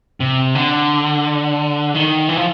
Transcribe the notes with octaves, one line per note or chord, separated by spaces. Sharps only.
C3
D3
D#3
E3
F3